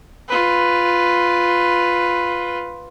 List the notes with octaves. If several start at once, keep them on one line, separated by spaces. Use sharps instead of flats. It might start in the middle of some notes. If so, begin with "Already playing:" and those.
F4 B4